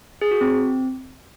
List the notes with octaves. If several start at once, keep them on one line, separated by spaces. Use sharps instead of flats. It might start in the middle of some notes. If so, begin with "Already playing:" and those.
G#4
F#4
C4